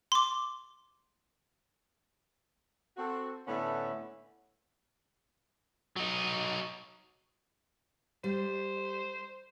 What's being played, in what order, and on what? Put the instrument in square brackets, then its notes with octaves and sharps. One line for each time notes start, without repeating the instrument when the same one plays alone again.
[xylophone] C6 D6
[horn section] C4 F#4 A4
A2 D3 B3 C#4 E5 F#5
[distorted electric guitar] F#3 D#4
[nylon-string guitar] G3 [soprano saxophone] C5